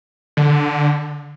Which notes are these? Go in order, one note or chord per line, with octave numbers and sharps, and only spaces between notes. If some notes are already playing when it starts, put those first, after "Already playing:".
D3